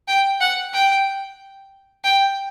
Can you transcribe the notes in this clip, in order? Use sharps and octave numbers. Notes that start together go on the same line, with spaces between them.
G5
F#5
G5
G5